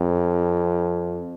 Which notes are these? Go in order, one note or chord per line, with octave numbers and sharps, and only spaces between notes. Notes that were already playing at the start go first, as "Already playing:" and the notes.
Already playing: F2